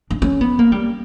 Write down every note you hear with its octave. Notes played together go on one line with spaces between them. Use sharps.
D4
C#4
B3
A#3
G3